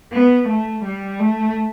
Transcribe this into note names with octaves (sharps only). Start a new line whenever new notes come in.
B3
A3
G3
A3